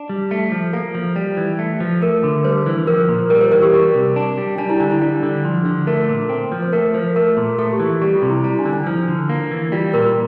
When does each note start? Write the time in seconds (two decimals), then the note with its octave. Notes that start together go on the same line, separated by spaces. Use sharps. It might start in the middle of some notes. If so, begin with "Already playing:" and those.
Already playing: D4
0.09 G3
0.31 A3
0.52 F3
0.73 A#3 A4
0.95 F3
1.16 G3
1.37 E3
1.59 A3
1.80 F3
2.02 A3 A#4
2.23 D3
2.44 G3 C5
2.66 E3
2.87 F3 A#4
3.09 A#2
3.30 G3 A#4
3.41 C5
3.51 E3 A#4
3.62 G4
3.73 G3
3.95 C3
4.16 D4
4.38 G3
4.58 G3 D4
4.69 E4
4.80 D3 D4
4.91 E4
5.01 G3 D4
5.23 D3
5.45 F3
5.66 D3
5.87 A3 A#4
6.09 A#2
6.29 C4
6.52 F3
6.62 C5
6.72 A3 A#4
6.94 F3 C5
7.16 A3 A#4
7.37 A#2
7.59 A3 A4
7.73 G4
7.80 E3
7.88 A4
8.01 G3 G4
8.15 F4
8.22 C3
8.29 E4
8.44 G3 E4
8.59 D4
8.65 D3
8.73 D4
8.86 F3 E4
9.08 D3
9.29 A#3
9.51 E3
9.72 G3 F4
9.93 A#2 A#4